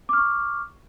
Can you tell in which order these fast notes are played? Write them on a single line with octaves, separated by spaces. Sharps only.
D6 F6 C#6